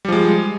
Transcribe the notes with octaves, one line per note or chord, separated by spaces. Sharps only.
F3 G3 G#3